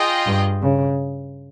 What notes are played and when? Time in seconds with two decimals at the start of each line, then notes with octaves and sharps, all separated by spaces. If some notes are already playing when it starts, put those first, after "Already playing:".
Already playing: F4 G#4 D#5 G5
0.26 G2
0.62 C#3